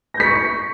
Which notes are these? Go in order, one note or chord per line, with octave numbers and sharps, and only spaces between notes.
C#6 G6 A#6 B6 C#7